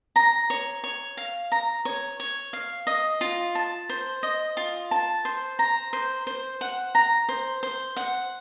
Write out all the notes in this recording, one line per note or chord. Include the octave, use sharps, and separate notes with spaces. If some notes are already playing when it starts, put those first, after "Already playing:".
A#5
C#5
C#5
F5
A#5
C#5
C#5
F5
D#5
F4
A5
C5
D#5
F4
A5
C5
A#5
C5
C5
F#5
A#5
C5
C5
F#5